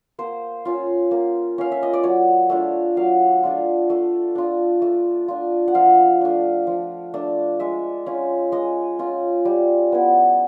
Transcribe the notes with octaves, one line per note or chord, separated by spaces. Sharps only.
A#3 C5
C#4 F4
A#3
C#4 F4 F5
E5
D#5
D5
F#3 C#5
A3 D4 F4
F#3 F5
A3 D4 F4
A3
D4 F4
A3
D4 F4
F#5
F3 F5
A3 D4
F3
A3 D4
G#3 E5
C#4 F4
G#3 D#5
C#4 F4
G3
B3 E4